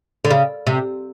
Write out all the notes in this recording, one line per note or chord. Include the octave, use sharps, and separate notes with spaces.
D3
C#3
C3